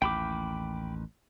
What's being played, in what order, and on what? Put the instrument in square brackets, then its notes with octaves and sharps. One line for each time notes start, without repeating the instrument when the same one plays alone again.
[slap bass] A1 D#2 [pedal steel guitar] G5 B5 D6